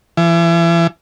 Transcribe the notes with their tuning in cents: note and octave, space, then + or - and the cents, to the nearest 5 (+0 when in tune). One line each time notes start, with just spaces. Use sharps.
E3 +35